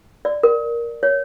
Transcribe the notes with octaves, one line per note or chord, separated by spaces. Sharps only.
D5
A#4
C#5